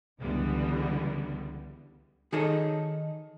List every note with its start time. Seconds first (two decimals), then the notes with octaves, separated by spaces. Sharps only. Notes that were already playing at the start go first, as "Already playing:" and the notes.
0.20 C#2 D3 E3 G3 B3
2.32 D#3 D#4 G#4 A4 C#5 D#5